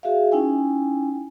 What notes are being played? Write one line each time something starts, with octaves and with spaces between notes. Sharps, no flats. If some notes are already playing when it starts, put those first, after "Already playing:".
F#4 G#4 E5 F5
C#4 D#4 E4 G5 G#5